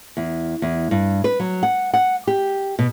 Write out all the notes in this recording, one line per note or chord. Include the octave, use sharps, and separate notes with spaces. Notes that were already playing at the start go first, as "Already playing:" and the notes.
E2
E2
G2
B4
F#3
F#5
F#5
G4
B2